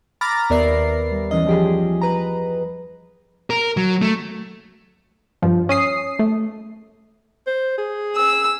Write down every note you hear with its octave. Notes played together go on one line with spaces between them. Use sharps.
A#5 B5 D6 F6 A6 A#6
D#2 B3 A#4 D5 E5 C7
G3
F#2 E3 C#4 D#5
F3 G4 G#4
B4 A#5
A#4
F#3
A3
G2 F3
C#4 D#6 C7
A3
C5
G#4
E6